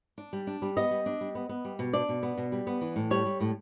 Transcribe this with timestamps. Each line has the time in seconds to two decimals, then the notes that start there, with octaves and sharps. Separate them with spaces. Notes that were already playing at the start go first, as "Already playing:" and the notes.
0.18 D4
0.33 G3
0.47 D4
0.62 G3
0.77 B3 D#5
0.91 G3
1.06 D4
1.21 G3
1.35 B3
1.49 B3
1.65 G3
1.79 B2
1.93 D4 D5
2.09 B2
2.23 B3
2.38 B2
2.52 G3
2.67 B3
2.81 E3
2.96 A2
3.11 G3 C#5
3.25 G3
3.41 A2